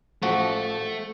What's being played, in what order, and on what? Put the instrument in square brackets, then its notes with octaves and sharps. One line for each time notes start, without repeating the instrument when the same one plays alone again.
[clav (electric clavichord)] A1 F3 F#4 [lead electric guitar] A3 A4